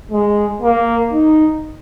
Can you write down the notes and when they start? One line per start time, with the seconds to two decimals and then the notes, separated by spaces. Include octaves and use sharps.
0.11 G#3
0.62 A#3
1.12 D#4